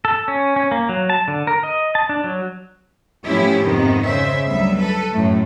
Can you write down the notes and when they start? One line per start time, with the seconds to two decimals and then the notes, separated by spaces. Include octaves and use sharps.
0.05 A4
0.28 C#4
0.56 C#4
0.71 A#3
0.89 F#3
1.10 A5
1.28 D3
1.47 A#4
1.63 D#5
1.95 A5
2.09 D4
2.24 F#3
3.26 A2 F3 B3 C#4 E4 G4
3.65 F2 G#2 C3 D#3 B3
4.07 C#3 C5 E5
4.46 D2 F#3 G3 B3 E5
4.79 A4 B4
5.13 F#2 A2 A3